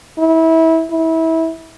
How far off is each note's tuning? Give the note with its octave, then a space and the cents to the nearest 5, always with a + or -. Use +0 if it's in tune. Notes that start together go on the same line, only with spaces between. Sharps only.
E4 -25
E4 -25